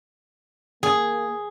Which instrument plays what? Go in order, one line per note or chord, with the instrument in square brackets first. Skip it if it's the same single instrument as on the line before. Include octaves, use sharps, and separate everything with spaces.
[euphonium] A#3 [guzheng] G#4